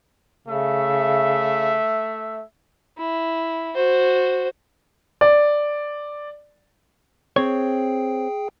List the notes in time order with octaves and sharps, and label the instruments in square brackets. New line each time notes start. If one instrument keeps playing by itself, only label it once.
[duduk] C#3 [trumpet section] A3 E5
[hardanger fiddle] E4
F#4 C5
[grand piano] D5
[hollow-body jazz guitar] C4 C#5 [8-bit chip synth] G#4 G5